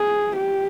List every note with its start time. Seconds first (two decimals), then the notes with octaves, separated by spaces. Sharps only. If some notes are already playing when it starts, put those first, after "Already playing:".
Already playing: G#4
0.36 G4